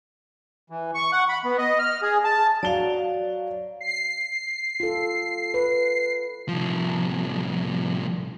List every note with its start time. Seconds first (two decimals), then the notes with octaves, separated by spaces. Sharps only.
0.70 E3
0.95 C#6
1.12 F#5
1.29 B5
1.44 B3
1.58 D#5
1.79 F6
2.02 G#4
2.24 A5
2.63 F#3 D5 F5 G7
3.81 C7
4.80 F4 A4
5.54 B4
6.49 C2 F3